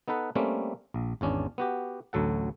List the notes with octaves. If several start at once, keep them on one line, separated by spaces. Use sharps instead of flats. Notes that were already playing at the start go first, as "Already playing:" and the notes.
B3 D#4 A4 B4 F#5
G3 A3 A#3 C4 C#4
A#1
G#1 E2 C#4 D4
B3 F#4 G4
A1 D2 F#3 A4 F#5